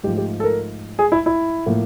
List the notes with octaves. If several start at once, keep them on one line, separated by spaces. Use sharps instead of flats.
G#2 F3 A3 G4
G4
A4
A#4
G#4
E4
E4
A2 F3 A#3